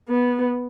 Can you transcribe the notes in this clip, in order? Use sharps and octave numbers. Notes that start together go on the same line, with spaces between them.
B3